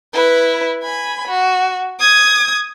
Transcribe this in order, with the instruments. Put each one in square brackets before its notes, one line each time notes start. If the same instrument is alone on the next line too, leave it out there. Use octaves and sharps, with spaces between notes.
[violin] E4 B4
G#5 B5
F#4
D#6 G#6